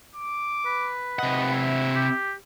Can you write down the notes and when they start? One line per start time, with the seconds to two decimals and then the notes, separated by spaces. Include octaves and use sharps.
0.16 D6
0.66 B4
1.19 C3 D#5 F#5
1.50 E4
1.95 G4